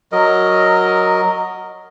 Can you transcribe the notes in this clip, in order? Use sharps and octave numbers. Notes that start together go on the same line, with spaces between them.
F#3 A#4 D#5